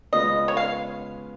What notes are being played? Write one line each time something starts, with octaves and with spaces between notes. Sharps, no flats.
C#3 G#3 B3 F4 D#5
C#5
F5